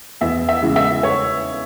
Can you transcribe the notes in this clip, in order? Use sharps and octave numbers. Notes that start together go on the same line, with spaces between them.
E2 E5
E5
C#3 E3 G#3
E5
C#5